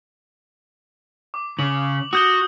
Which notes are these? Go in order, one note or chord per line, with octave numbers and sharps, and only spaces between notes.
D6
C#3 F#7
F#4 D#6 G6 G7